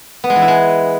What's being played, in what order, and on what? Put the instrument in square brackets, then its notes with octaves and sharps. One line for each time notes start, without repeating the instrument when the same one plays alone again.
[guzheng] B3
G#3
E3
E4
G#3